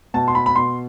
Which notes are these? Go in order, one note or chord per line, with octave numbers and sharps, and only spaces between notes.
B2 A5
C6
B5
B5
B2 C6